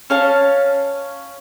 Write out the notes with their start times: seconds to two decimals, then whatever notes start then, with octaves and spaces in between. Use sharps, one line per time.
0.10 C#4 C#5 F5 A5